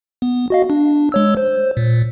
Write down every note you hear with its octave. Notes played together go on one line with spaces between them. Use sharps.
B3
F#4 D#5 F5
D4
G#3 C#5 E6
C5
A#2